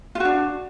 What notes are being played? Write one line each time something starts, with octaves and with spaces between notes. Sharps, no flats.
D4 F4 F#4